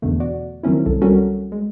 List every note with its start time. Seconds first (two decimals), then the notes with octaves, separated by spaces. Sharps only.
0.02 E2 B2 D3 A3
0.20 F#4 D5
0.63 D#3 F#3 C4 C#4 E4
0.86 C2 A4
1.02 G3 C#4 F#4 A4 A#4
1.52 G#3